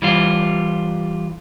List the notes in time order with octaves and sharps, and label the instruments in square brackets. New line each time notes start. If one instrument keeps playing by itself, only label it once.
[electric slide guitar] E3 G3 F4